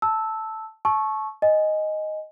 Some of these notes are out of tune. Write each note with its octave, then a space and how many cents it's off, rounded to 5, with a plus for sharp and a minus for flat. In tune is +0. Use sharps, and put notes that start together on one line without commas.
A5 +0 E6 -10
A5 -30 C#6 -10 E6 +0
D#5 +0 G#5 +0